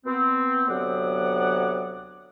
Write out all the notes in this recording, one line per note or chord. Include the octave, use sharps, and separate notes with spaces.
B3 C4
D2 C3 F#3 B3 D5 F#5